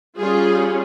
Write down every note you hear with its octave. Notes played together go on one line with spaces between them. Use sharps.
G3 C#4 F4 G#4